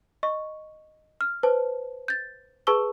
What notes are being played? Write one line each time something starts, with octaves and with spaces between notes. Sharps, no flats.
D#5 C#6
F6
B4 C5 A5
G6 A6
G#4 B4 A5 C#6 E6 G7